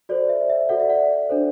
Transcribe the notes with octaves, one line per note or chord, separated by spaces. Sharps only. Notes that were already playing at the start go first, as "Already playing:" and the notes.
F#4 A4 C5 D5
E5
E5
F#4 A4 D5 F#5
E5
D5 F#5
D4 A4 C5